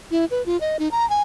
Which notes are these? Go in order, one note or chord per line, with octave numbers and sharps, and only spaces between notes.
E4
B4
F4
D#5
D#4
A#5
G#5